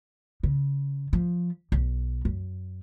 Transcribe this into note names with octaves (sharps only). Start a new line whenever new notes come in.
C#3
F3
B1
F#2